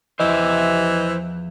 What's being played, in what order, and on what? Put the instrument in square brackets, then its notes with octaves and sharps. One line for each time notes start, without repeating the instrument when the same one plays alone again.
[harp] E2 F3 [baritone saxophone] E3 [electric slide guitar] C5 E5 [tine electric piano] D#5